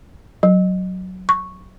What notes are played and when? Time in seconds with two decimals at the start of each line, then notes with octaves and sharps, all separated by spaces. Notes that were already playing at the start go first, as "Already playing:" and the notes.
0.43 F#3
1.29 C#6